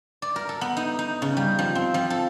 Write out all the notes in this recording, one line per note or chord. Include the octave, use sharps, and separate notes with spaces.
D5
A#4
A4
B3
D#4
D#4
C#3
G3
F3
C4
F3
A4